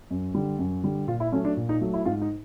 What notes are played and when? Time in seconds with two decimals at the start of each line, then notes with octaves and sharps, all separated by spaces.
0.11 F#2
0.35 D3 G3
0.59 F#2
0.83 D3 G3
1.07 A#2 F4
1.20 E4
1.32 F#3 A3 C#4
1.45 D4
1.57 A#2
1.69 D#4
1.81 F#3 A3
1.94 E4
2.05 G#2 F4
2.22 D#4